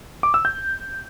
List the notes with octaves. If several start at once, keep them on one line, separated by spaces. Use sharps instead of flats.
D6
E6
G6